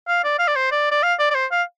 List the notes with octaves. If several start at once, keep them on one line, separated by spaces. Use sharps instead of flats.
F5
D5
F5
D5
C5
D5
D5
F5
D5
D5
C5
F5